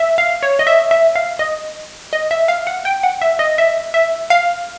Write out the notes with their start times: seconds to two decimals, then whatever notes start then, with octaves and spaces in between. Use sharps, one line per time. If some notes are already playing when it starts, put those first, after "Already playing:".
Already playing: E5
0.18 F5
0.43 C#5
0.59 D#5
0.67 E5
0.91 E5
1.16 F5
1.39 D#5
2.13 D#5
2.31 E5
2.48 F5
2.67 F#5
2.85 G5
3.03 F#5
3.22 E5
3.39 D#5
3.58 E5
3.94 E5
4.30 F5